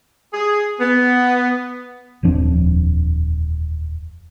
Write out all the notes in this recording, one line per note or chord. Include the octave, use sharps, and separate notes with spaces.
G#4
B3
D#1 F2 F3 D4